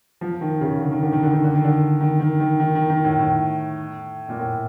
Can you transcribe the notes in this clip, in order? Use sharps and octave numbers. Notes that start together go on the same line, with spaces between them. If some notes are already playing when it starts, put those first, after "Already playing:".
F3
D#3
C#3
D3
D#3
D3
D#3
D3
D#3
D3
D#3
D3
D#3
D#3
D#3
D#3
D#3
D#3
A2
A2
A#2
A2